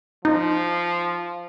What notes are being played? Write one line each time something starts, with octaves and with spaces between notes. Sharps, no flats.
F3 D#4